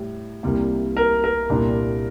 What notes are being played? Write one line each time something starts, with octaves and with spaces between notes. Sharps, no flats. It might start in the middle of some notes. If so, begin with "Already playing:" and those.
Already playing: A2 G3
C2 C3 G3 A#3
A#4
A#4
C2 A#2 G3 D4